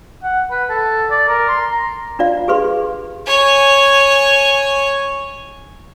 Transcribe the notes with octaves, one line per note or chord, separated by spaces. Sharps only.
F#5
B4
A4
D5
A#4
C6
A#5
D4 F4 D5 F5
G4 G#4 B4 F5 C6
C#5 G#5